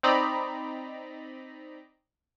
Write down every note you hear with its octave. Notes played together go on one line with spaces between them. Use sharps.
C4 D#4 D5 D#5 A#5 B5